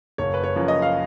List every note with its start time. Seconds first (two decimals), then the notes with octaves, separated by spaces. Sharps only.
0.18 F#1 C#5
0.34 B4
0.43 C#5
0.56 F#2 F3
0.68 D#5
0.82 F5